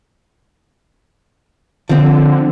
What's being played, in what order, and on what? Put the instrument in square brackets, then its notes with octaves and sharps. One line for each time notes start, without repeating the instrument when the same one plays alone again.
[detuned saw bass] D3 [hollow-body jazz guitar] F3 C4